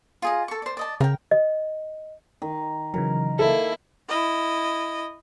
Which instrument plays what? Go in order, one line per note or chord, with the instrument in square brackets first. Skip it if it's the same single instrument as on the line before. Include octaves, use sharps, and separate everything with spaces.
[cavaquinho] F4 G#4 D#5
A4 C#6
C5 D5
D5 D#5 A5
[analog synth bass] C#3 [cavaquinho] A#4 G5
[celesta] D#5
[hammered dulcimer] D#3
[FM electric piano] C#3 E3 F#3 [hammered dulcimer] A#4
[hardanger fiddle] A#3 E4 [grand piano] A4
[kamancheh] E4 D#5